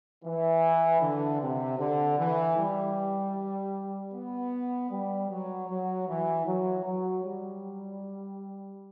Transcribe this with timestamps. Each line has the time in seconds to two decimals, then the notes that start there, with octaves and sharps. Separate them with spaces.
0.24 E3
1.01 D3
1.41 C3
1.79 D3
2.18 E3
2.57 G3
4.14 B3
4.91 G3
5.30 F#3
5.69 F#3
6.08 E3
6.47 F#3
6.85 F#3
7.24 G3